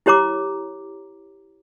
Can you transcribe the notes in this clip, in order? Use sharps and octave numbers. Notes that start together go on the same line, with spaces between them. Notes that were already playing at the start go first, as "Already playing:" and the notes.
E4 G4 C#5 A#5 D6